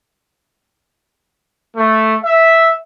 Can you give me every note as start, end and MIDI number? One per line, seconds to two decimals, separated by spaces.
1.77 2.17 57
2.24 2.73 76